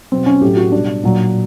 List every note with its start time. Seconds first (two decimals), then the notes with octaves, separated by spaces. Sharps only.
0.12 B2 F#3 C4
0.26 C#4
0.41 A2 F#3 G4
0.57 F#4
0.72 B2 G3 D4
1.04 A#2 F#3